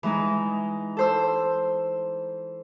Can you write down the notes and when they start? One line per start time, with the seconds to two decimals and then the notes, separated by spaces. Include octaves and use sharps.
0.03 E3 G#3 D#4
0.97 A4 C5 E6